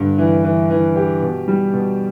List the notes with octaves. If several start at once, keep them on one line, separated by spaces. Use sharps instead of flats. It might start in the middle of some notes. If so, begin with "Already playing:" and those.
Already playing: G2 D3
E3
E3
E3
G4
B2
G3
B2